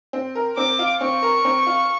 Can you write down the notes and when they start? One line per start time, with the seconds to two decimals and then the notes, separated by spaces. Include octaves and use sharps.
0.13 C4
0.35 A#4
0.57 C4 D6
0.79 F4
1.01 C4 C#6
1.22 A#4
1.45 C4
1.66 F4